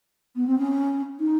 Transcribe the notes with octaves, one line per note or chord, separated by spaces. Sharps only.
B3
C4
C#4
D#4